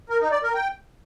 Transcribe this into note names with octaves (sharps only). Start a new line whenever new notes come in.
A#4
D#4
D5
A#4
G5